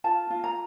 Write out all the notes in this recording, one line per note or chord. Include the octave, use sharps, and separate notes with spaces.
F4 A5
F4
A#5